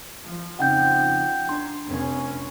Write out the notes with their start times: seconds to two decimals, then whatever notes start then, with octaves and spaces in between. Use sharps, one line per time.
0.24 F3
0.59 F2 C#3 D#4 F#5 G5 G6
1.49 D4 A#5 C6 G#6
1.87 F1 C#4